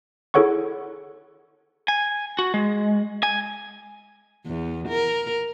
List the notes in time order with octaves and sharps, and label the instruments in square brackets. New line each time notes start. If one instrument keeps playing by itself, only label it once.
[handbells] E4 G#4 A4 C#5 F#5 C#6
[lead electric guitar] G#5
F#4
G#3
G#5
[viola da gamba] E2
A#4